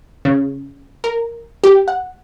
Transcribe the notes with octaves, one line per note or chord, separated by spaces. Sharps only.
C#3
A#4
G4
F#5